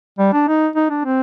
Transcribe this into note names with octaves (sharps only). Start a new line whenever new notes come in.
G3
D4
D#4
D#4
D4
C4